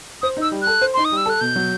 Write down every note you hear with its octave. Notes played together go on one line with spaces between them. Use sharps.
C5 D#6
D#4 E6
G3
A4 F#6
C5
D#4 C6
D#6
G3
E6
A4 F#6
B2 G6
F#3